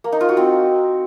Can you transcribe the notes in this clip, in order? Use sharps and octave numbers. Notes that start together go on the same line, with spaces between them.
A#3
D#4
F4
F#4
C4